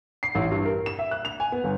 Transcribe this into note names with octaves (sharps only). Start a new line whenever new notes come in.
C7
A1
G2
A#4
E7
E5
F#6
F7
G#5
B3
G1